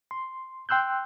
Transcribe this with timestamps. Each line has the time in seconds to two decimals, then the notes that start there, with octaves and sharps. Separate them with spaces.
0.11 C6
0.69 G5 C6 E6 F#6 G6